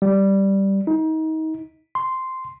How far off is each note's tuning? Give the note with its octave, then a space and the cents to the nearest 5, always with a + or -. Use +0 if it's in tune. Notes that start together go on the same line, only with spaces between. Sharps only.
G3 -5
D#4 +30
C6 -5